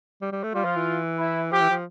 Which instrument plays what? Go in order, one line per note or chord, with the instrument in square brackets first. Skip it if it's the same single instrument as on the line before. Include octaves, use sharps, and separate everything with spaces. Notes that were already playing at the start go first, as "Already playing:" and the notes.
[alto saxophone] G3
G3
A3
[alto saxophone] G3 [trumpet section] F4
[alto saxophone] F3
E3
[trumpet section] E4
[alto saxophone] F3 [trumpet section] G4
[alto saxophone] E3
F3